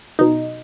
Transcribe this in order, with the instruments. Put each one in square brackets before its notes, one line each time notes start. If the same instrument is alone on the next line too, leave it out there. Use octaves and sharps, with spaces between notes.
[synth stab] B1 B2 D#4